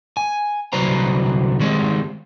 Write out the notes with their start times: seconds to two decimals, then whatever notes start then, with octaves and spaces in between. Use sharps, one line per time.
0.17 G#5
0.73 C2 D3 F#3 B4 C5 A#5
1.60 D#3 G3 G#3 C4